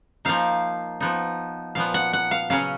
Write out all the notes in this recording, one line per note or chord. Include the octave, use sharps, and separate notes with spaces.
F3 A#3 D#4 F5
F3 B3 D#4
A#2 F3 B3 F5
F#5
F#5
F5
C#3 F#3 C#4 F5